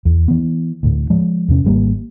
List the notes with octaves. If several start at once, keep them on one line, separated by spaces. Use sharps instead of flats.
E2
E3 B3
D2 A2
F3 G#3
E2 C3 C#4
G#1 G3 A#3